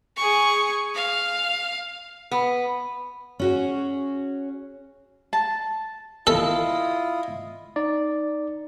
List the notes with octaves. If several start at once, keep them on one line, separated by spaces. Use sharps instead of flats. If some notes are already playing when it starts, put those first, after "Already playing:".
G#4 C#6
F5
B3
C#4 F#4 G#4
A5
E4 F4 A4 D#5
D#4 D5